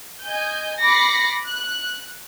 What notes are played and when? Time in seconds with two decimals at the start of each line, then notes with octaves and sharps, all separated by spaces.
0.24 D#5 G#5 G6
0.81 B5 D6 A6 A#6 C7 C#7
1.45 F#6